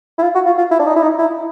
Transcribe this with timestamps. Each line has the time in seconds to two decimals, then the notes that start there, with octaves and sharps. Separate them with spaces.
0.18 E4
0.23 F4
0.35 F#4
0.46 F4
0.58 F4
0.71 E4
0.79 D4
0.86 D#4
0.96 E4
1.03 D#4
1.19 E4